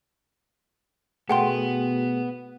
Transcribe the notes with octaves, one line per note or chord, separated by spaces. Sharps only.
B2 A3 B3 G#4 F#5 G5 C6